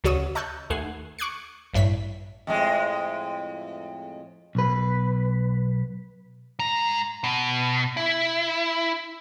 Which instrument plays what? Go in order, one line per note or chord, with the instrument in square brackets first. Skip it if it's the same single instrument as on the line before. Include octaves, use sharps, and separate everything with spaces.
[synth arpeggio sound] D2 C#3 F#4 C#5 D#6 E6
D#5 A5 C#6 E6 F#6 G6
D#2 A3 F#5 G#5 C7
C#6 D6 F#6 G#6 C7
A1 G2 E4 C#5 B6
[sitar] F2 A2 G#3
[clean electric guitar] B1 B4
[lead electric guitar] G#2 A#5
B2
E4